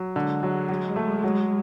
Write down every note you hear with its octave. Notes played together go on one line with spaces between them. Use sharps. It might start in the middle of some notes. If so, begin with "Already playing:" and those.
Already playing: F#3
D3 G#3
F#3
F#3
A3
F#3